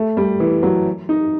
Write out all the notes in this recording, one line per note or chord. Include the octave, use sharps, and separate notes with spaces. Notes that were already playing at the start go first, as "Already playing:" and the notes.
Already playing: A3
G3
E3
F#3
D#4